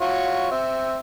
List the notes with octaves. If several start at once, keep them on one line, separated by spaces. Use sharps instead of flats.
F4 F#4 C#5
C4 E5